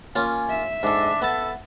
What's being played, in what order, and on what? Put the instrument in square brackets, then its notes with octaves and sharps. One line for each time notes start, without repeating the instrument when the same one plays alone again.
[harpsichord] A#3 C#4 F4 [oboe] G#5
[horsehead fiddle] E5
[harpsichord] G#2 A4 [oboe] D4
[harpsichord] B3 A5 [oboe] A4